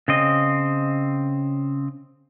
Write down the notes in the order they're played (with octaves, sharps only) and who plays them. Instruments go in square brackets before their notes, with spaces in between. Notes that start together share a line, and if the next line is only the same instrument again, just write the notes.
[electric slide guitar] C#3 C4 D#5